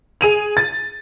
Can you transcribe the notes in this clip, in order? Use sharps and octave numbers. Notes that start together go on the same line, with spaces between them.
G#4 D#7 F7
A6